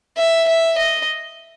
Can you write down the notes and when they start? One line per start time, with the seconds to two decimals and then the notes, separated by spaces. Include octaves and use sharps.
0.18 E5
0.48 E5
0.78 D#5